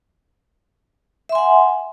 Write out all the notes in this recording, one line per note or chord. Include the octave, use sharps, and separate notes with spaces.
E5 F#5 G#5 C6